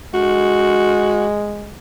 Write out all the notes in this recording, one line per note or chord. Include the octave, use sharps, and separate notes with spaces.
G#3 F#4